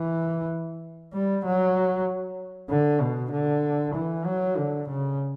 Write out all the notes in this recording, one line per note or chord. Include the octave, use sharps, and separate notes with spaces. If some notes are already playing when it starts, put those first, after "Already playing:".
Already playing: E3
G3
F#3
D3
B2
D3
E3
F#3
D3
C#3